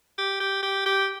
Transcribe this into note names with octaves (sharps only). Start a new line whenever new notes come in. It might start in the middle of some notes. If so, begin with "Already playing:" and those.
G4
G4
G4
G4